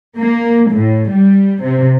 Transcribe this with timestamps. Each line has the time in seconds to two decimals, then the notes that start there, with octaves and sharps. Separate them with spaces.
0.18 A#3
0.71 A2
1.12 G3
1.63 C3